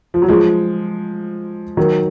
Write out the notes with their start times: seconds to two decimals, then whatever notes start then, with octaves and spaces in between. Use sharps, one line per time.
0.14 F3
0.22 F#3
0.28 F3 G#3
1.77 D#3 F#3